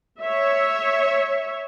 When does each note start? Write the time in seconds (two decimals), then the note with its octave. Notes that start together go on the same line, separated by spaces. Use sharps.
0.21 C#5 E5